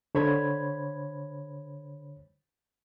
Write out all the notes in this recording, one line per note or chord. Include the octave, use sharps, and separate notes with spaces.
D3 C5 C#5 B5 G#6